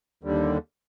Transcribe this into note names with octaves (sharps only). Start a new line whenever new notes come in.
D#2 D3 G3